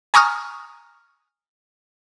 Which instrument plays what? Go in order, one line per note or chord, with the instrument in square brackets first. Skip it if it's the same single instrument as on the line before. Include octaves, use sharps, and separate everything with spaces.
[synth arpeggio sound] G#5 A#5 C#6 D#6 F6